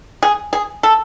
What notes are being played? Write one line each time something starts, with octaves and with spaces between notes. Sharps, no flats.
G#4
G#4
A4